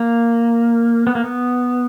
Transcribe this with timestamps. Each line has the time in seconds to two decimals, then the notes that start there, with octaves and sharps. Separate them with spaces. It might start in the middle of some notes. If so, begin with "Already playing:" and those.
Already playing: A#3
1.07 B3
1.15 A#3
1.24 B3